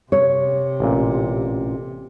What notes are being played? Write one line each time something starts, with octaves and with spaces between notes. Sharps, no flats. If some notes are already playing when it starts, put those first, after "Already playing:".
C3 C#5
A1 A#2